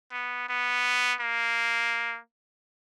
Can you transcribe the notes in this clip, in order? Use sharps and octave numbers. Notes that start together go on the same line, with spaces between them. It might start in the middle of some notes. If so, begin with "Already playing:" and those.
B3
B3
A#3